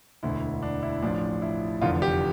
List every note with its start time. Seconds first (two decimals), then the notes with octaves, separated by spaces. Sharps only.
0.23 E1 D2 D3 E4
0.63 D4
0.83 E4
1.02 A1 A2 F3 D4
1.42 E4
1.81 F1 E2 D3 F3 F4
2.02 G4